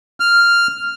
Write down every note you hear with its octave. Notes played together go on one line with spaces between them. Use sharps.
F6